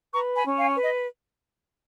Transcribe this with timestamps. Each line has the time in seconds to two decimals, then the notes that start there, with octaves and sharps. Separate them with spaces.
0.13 B4 A#5 C#6
0.36 G#5 B5
0.44 C#4
0.59 F5 G#5
0.75 B4
0.83 D#5